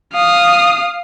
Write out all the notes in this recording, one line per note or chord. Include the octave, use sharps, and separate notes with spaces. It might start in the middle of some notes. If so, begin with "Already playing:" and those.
F5 D#6